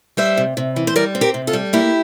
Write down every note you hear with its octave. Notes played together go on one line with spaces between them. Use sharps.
G3 C5 E5
C3
C3
E3
C5
G3 A#4 D5
C4
G4 A#4
C3
F4 A4
G3
A#3 E4 G4